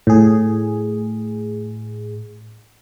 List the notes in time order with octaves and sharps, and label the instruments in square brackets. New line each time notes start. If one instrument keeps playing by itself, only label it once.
[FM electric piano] A2 G#4